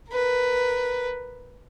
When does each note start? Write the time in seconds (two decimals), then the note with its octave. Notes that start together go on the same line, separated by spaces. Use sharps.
0.11 A#4 B4